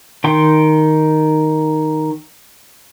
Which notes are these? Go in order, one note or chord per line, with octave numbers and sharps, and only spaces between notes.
D#3 G5 C6